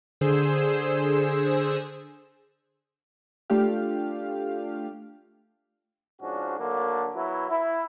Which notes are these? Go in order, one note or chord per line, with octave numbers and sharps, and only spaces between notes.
D3 G#4 C5 E6
A3 D4 F4 G4 F5
G#2 F3 C#4 D4 F#4
D3 F#3 A3 A#3
F#3 B3 E4
E4